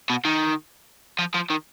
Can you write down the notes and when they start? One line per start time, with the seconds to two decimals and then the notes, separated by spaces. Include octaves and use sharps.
0.10 B2
0.25 D#3
1.19 F3
1.34 F3
1.50 D#3